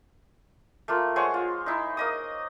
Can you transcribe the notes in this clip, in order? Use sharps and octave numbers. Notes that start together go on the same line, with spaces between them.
A3 A#3 F4
G#3 C5 C#5 F#5
F4
D#4 E4
A#3 D#5 D#6